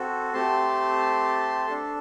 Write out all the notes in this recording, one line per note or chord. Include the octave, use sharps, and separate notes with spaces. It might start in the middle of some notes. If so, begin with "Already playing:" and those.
Already playing: C4 F#4 A4
A3 C4 G4 A5 C6
D4 A4